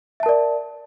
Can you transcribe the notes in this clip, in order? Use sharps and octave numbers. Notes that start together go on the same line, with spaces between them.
A#4 D5 E5 A5